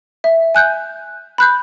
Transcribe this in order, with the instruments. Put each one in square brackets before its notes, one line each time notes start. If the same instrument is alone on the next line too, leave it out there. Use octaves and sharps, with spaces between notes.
[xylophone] E5
G#5 F#6 G6
B5 F#6 G6